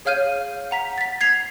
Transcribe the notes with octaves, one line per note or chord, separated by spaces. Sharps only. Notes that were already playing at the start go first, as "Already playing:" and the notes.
G#4 C#5 F5 F6 G6 D#7
F#5 A#5 B6
A6 B6
G#6 C7 F7